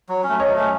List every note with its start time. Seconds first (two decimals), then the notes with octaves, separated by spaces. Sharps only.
0.09 F#3
0.24 C#4
0.29 A3
0.40 F#3 C#5 D#5
0.56 A3 C#4